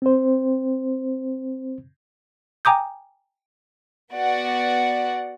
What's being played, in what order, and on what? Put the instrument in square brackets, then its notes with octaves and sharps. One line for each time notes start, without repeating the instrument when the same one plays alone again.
[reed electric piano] C4 C5
[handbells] G5 G#5 A#5 D6 D#6 G6
[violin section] B3 F#4 D5 F#5